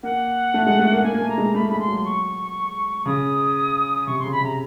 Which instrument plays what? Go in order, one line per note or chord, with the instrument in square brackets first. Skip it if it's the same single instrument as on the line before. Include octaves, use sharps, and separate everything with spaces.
[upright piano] A#3 [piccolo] F#5
[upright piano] A3
G#3
A3
A#3
[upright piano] A#3 [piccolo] G#5
[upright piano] A#3
A3
[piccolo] A#5
[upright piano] G#3
[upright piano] A3 [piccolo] B5
[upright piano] G#3 [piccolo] B5
[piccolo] C6
[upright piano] F#3
[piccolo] C#6
[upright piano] C#3 [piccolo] D#6
[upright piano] C3 [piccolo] C#6
[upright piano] C#3 [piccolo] C6
[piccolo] B5
[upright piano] C3 [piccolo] A#5